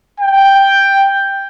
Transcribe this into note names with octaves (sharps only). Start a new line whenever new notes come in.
G5